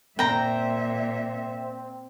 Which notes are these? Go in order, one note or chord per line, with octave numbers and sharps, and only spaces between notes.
A#2 C4 E5 G5 A#5